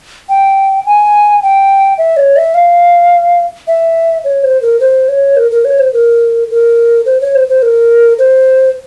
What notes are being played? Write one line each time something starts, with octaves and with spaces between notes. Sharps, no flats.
G5
G#5
G5
E5
C#5
E5
F5
E5
C#5
C5
A#4
C5
C#5
A#4
A#4
C#5
C5
A#4
A#4
C5
C#5
C5
C5
A#4
C5